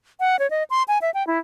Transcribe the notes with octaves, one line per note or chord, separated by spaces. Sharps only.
F#5
C#5
D#5
C6
G#5
E5
G5
E4